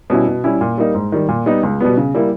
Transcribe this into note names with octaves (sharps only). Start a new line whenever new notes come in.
B2 G3 C#4 E4
B2
G3 C#4 E4
A#2
G3 A#3 D#4
G#2
D#3 G3
A#2
G3 B3 D#4
C#2
B2 G3 B3
C#3
G3 A#3 E4